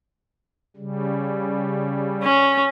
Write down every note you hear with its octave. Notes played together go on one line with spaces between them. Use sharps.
C#3 G3
C#4